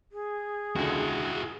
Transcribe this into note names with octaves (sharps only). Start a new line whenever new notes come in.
G#4
C#2 D3 E4 F#4